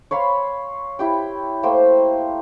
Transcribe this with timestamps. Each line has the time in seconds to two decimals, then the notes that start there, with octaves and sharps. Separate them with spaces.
0.11 C#5 F5 B5 C6
0.99 E4 G4 G5
1.63 A3 A#3 C5 G5